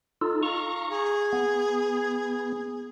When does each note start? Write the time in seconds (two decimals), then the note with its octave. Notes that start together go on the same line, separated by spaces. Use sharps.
0.21 D#4 F4 A4
0.43 F5 A#5 C#6
0.89 G#4
1.33 B3